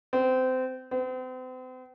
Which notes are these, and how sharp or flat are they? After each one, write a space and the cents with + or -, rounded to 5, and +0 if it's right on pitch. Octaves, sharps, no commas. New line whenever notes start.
C4 -25
C4 -40